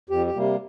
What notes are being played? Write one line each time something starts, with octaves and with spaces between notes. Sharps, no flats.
F2 G4
G4
C3 G3 A#3